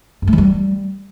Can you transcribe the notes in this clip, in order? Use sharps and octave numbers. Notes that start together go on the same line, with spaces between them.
F#2
A3
E3
G3